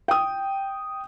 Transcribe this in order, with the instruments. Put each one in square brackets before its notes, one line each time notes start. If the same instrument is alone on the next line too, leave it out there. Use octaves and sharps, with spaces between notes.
[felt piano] G5 D#6